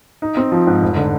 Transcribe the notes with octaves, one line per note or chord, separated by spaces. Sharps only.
D#4
C4
F3
G#2
F1
D3